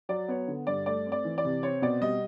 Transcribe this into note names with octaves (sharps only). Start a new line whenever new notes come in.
F#3 D5
B3 C#5
D3
G2 D5
A3 D5
C4
D5
E3
D5
C3
C4 C#5
B2 D5
G3 D#5